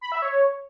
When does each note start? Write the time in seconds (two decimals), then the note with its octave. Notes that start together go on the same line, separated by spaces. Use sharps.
0.01 B5
0.12 E5
0.22 C#5